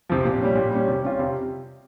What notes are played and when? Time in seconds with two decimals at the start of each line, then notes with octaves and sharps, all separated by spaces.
0.10 C3 F3
0.25 A#2
0.40 G3 C#4
0.55 A#2
0.71 G3 C#4
0.88 C3
1.03 G3 C#4 F4
1.19 C3